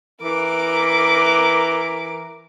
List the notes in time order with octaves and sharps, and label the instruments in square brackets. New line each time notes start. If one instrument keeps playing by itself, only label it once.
[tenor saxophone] E3 [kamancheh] A#4 D6